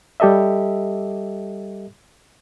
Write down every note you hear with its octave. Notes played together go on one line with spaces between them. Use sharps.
G3 G4 A4 D#5 E5